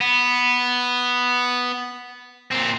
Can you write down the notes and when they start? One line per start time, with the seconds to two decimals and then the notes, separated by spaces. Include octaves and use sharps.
0.01 B3
2.51 A#2 C4